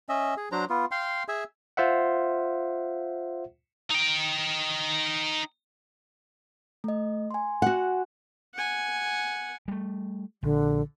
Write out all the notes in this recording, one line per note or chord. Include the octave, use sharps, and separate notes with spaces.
C#4 D#5 E5
G#4
F#3 D4 C5 A#5
B3 F4
F5 G5 C6
G#4 E5 G#5
F4 C5 E5 F#5
D#4 G5
A3 D#5
G#5 C6
F#4 F#5
F#5 G#5
G3 A3
A#1 D3